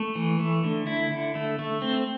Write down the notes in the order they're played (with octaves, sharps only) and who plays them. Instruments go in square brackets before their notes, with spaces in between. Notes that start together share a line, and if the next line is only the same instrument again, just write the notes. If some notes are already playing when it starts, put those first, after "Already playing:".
Already playing: [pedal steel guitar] A3
E3
A3
D3
E4
D3
A3
A3
C4